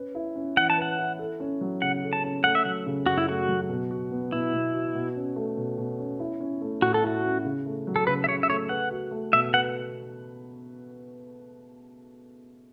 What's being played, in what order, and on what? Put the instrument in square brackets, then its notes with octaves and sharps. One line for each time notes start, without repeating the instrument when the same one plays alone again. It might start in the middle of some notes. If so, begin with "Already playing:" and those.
Already playing: [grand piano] C#4 B4
E4
C#4
[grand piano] E3 [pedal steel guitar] F#5
[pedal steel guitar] A5
[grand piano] B4 [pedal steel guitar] F#5
[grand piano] E4
A4
C#4
F#3
[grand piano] C#3 [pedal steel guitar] F#5
[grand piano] A4
[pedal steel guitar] A5
[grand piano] C#4
[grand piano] A3 [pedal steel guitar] F#5
[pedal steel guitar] E5
[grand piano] F#3 [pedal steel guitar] F#5
[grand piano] C#3
[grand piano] F#2 [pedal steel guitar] F#4
[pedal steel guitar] E4
[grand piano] A3 [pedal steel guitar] F#4
[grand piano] F#3
B2
F#4
B3
[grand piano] B2 [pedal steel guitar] E4
[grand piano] B2
F#4
B2
C#4
A3
B2
B2
C#4
E4
C#4
A3
[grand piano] A2 [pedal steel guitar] F#4
[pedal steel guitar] A4
[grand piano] E4 [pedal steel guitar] F#4
[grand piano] C#4
C#3
A3
F#3
[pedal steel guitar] A4
[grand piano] C#3 [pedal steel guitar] B4
[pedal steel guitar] E5
[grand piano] C#3 [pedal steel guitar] C#5
[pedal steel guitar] E5
[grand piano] A3 [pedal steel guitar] C#5
[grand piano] B4 [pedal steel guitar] F#5
[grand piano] F#4
A3
[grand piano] B2 [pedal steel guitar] E5
[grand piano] B4 [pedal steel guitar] F#5